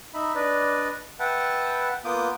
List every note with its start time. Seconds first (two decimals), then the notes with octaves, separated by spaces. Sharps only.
0.14 D#4 E5 B5
0.35 D4 B4 D5 D#5
1.20 B4 E5 F#5 G5 A5
2.05 A#3 B3 F4 D6 D#6 G6